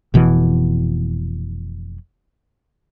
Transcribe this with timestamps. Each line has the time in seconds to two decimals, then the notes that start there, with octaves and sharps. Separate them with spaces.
0.14 F1 B2 E3